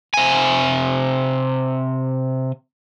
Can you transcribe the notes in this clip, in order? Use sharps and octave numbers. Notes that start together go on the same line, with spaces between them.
C3 G#5